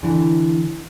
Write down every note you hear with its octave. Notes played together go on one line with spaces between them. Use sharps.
D3 E3